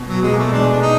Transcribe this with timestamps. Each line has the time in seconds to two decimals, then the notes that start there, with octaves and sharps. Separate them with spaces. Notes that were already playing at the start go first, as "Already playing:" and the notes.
Already playing: B2
0.08 F#3
0.22 B2 G#3
0.32 A#3
0.38 A3
0.52 G#3 D4
0.71 D4
0.82 D#4